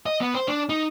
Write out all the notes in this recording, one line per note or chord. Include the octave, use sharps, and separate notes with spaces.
D#5
B3
C5
D4
D#4